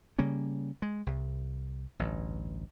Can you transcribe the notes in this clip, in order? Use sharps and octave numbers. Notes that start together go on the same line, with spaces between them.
C#3 G3 A#3 C#4
G#3
C2
A1 D2 G2